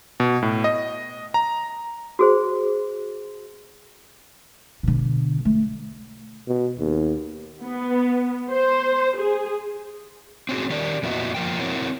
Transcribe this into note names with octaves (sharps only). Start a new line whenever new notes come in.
B2
A2
D#5
A#5
F#4 G#4 C5
B2 D3
A3
B2
D#2
B3
C5
G#4
C4 C#4 F#4 G#4
D#3 G4 A#4 D5
F2 A#2 B3 E4 F#4 D#5
F3 A#3 G5
C4 E4 F#4 A#4 C#5